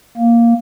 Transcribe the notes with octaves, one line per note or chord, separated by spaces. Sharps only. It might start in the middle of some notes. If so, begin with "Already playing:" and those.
A#3